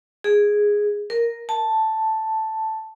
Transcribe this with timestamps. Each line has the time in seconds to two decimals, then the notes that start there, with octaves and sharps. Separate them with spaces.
0.24 G#4
1.10 A#4
1.49 A5